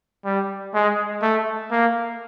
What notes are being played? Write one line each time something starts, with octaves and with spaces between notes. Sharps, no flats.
G3
G#3
A3
A#3